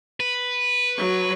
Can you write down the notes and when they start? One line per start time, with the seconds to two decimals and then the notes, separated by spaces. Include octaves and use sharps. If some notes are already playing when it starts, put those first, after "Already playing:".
0.20 B4
0.96 F#3 C#6